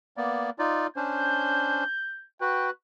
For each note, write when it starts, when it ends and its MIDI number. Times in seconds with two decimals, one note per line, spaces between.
0.17 0.50 58
0.17 0.50 59
0.17 0.50 74
0.59 0.87 63
0.59 0.87 65
0.59 0.87 74
0.96 1.84 61
0.96 1.84 62
0.96 1.84 72
0.96 2.27 91
2.41 2.70 66
2.41 2.70 71
2.41 2.68 79